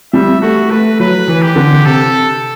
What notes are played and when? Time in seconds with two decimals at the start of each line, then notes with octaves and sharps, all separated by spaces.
0.13 G3 E5
0.41 A3 F#4
0.71 A3 B4
1.00 F#3 B4
1.28 E3
1.42 G4
1.56 D3
1.85 C3 A4